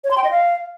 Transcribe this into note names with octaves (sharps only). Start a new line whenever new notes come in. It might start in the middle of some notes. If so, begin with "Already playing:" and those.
C#5
C6
G5
D#5
F5